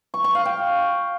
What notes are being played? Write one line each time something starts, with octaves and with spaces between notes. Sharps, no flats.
C#6
C#6
F5
G5